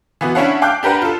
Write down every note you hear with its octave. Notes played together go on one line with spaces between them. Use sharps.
E3 B3 F#4
C#4 D4 E4 C#5 F5 F#5
F5 G5 D6 F#6 G6
D4 G4 A#4 B4 F#5
F4 A4